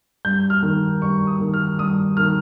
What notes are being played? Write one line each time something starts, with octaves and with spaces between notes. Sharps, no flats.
G2 G6
F6
D#3
G2 C#6
D#6
D#3
F6
G2 D#6
D#3 F6